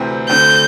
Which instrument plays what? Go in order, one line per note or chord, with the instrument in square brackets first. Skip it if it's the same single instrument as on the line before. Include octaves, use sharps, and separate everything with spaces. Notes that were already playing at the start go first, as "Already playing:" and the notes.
Already playing: [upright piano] D2 C3 E3 C4
[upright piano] D2 D3 C4 [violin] G6